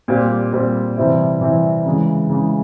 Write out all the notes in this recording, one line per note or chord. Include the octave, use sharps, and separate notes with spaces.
A#2 G3 C4 G4
A#2 G3 C4 G4
C3 E3 G3 C4 E4
C3 E3 G3 C4 E4
C#3 E3 G#3
C#3 E3 G#3